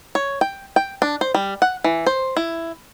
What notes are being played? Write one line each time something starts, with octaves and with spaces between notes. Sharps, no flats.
C#5
G5
G5
D4
C5
G3
F#5
E3
C5
E4